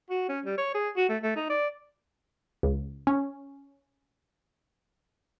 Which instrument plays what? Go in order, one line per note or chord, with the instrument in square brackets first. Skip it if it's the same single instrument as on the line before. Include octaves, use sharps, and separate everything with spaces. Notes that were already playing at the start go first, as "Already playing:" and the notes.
[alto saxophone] F#4
C#4
G3
C#5
G#4
F#4
A3
A3
D#4
D5
[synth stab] C#2
C#4